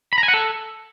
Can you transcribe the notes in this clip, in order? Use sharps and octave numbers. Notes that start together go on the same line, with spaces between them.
B5
A#5
G#5
F#5
A4